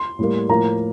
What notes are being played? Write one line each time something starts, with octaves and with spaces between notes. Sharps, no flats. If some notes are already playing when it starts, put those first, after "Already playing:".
Already playing: C6
A2 G3 A#3
A2 F3 A#3 A#5